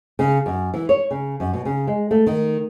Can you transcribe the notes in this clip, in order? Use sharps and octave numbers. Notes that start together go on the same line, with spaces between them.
C#3
F#2
E3
C#5
C#3
F#2
B2
C#3
G#3
A3
D#3